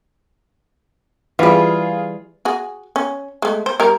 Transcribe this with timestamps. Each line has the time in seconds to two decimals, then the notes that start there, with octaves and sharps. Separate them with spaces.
1.39 E3 G3 F4 G#4
2.45 F#4 G#4
2.96 C#4
3.42 G#3 A3
3.66 C5
3.80 G3 A#4